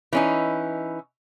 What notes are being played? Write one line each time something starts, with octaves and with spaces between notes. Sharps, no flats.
E3 C#4 D#4